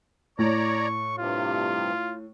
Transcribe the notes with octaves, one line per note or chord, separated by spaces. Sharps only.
A2 C#5 D5 A#5 C#6
G2 C3 F4